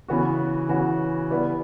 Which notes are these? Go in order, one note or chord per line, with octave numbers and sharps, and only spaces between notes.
C#3 E3 B3 F#4
C#3 E3 B3 F#4
G3 B3 E4 B4 D5